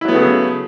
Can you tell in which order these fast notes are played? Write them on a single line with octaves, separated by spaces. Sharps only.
E4 F#3 B3 A3 C#3